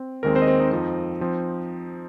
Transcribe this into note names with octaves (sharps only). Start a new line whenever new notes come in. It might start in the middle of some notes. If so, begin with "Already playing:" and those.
Already playing: C4
D#2 D#3 G#3 C4 A#4
C4 C5
D#5
C4 C5
D#4 D#5
F2 F3 C4
F3 C4